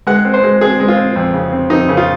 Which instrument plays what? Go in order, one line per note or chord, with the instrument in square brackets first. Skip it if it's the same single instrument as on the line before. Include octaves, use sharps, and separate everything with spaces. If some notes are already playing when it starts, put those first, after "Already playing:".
[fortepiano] G#3 F#5
C4
C5
G#3
C4 G#4
G#3
F4
C4
F2
C#3
C4
F2 D#4
C#3
F4